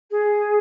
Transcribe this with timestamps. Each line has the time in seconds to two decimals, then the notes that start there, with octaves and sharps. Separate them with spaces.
0.10 G#4